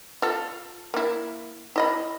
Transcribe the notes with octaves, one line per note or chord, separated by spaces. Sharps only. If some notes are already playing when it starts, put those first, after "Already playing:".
F4 A4
A#3 E4
E4 D#5 B5